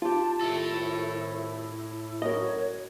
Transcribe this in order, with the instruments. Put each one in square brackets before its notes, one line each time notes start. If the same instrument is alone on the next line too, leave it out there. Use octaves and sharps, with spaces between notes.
[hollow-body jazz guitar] F4 G4 [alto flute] A5
[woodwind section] C2 F2 D#3 [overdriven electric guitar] A2 A4 [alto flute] E4
[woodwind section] F#2 F#4 [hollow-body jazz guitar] A#4 D#5 [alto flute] C#5